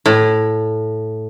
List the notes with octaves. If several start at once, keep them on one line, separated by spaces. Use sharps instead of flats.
A2